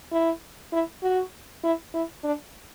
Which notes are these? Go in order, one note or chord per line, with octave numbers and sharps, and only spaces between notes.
E4
E4
F#4
E4
E4
D4